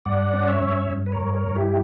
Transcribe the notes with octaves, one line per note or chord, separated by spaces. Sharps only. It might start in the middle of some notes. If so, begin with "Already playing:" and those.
G2 D5 F#5
C#4
C#5 E5
G2
G2
B4
A#4 C#5
G2
A#4 C#5
G2
E4 G4